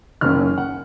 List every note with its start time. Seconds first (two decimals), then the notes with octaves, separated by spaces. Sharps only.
0.21 F#1 F#2 D#3 A#3 C#4 F6
0.58 F#5